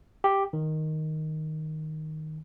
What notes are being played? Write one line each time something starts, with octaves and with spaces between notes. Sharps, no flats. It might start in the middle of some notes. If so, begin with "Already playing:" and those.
G4
D#3